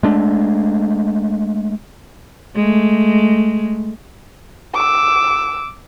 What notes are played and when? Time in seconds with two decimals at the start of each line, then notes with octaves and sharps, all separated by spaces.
0.03 G#3 A3 D4
2.55 G#3 A3
4.74 D6 E6